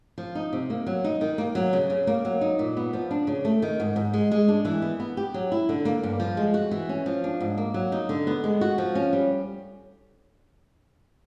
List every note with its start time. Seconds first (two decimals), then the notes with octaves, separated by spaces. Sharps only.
0.18 F3
0.35 D#4
0.53 C3
0.70 A#3
0.87 F#3
1.04 D#4
1.21 D#3
1.38 A#3
1.55 F#3
1.73 C#3
1.90 C#3
2.07 A#3
2.25 F#3
2.41 D#4
2.59 A#2
2.77 B3
2.93 F3
3.11 D4
3.27 C#3
3.45 A3
3.62 D#3
3.80 G#2
3.96 G#2
4.14 G#3
4.31 G#3
4.48 D4
4.65 E3
4.82 B3
5.00 B3
5.17 G4
5.34 F#3
5.52 E4
5.69 D3
5.85 A#3
6.03 G2
6.20 F3
6.37 G#3
6.54 F#4
6.71 E3
6.89 C#4
7.06 F3
7.24 D4
7.40 G#2
7.57 A#3
7.74 F#3
7.92 D#4
8.09 D3
8.27 B3
8.44 G#3
8.61 F#4
8.78 F3
8.95 C#4
9.13 G3